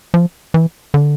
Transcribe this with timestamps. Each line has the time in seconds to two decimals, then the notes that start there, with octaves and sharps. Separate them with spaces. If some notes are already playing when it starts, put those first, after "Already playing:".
0.14 F3
0.54 E3
0.94 D3